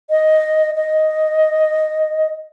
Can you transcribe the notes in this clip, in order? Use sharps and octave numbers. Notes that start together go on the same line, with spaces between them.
D#5
D#5